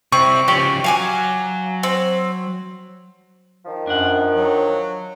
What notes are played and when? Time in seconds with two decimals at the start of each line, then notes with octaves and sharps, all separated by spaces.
0.12 C3 C4 E4 C#6
0.48 C#3 F3 G4 C#5 D5
0.84 F#3 F5 G#5 D6
1.83 C4
3.65 D#3 F3
3.87 F#2 D4 F#5
4.34 F#3